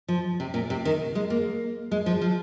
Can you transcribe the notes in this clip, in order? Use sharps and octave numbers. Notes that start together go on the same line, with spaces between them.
F3
C3
A#2
C3
D#3
G#3
A#3
G#3
F3
F3